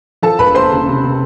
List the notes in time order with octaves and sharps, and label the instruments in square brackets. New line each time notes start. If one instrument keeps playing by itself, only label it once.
[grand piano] F3 [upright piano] A4 A5
[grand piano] E1 [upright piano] B4 B5
[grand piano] A#3 [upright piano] C5 C6
[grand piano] C#3
C3
C3